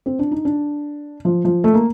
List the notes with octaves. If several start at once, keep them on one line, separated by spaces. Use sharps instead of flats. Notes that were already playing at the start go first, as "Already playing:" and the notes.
C4
D4
D#4
D4
F3
F3
A3
A#3